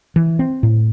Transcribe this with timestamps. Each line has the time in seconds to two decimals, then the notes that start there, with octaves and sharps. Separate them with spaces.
0.16 E3
0.39 C4
0.63 A2